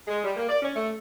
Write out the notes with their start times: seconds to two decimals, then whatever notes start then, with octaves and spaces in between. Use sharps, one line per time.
0.08 G#3
0.24 G3
0.37 A#3
0.49 D5
0.62 C#4
0.75 A3